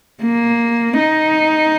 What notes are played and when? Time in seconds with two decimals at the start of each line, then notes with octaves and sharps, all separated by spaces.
0.23 A#3
0.98 D#4